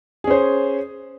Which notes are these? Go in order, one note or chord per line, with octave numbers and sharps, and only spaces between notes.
C#4 G#4 C5